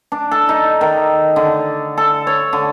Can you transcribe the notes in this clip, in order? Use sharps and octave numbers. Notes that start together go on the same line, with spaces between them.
D4
A4
D#4
D#3
D3
A4
C#5
D3